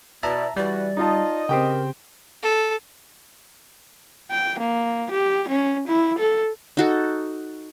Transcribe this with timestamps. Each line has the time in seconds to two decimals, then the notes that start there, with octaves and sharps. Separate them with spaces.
0.23 B2 E4 D5 E5 A5 A#5
0.57 E3 G3 F#4 D5
0.97 D#4 F4 D#5 A5
1.49 C#3 C4 G4 A#4 G5
2.43 A4
4.31 G5
4.59 A#3
5.11 G4
5.49 C#4
5.88 E4
6.19 A4
6.77 D#4 F#4 A4